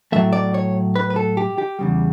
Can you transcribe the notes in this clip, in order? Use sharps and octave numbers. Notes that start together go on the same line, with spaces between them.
A2 F#3 A3 E5
D5
C#5
B4
B4
A4
G4
G4
E2 C#3 G3